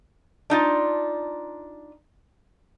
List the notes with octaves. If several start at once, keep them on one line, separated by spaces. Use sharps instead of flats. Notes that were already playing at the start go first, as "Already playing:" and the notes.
D4 D#4 F4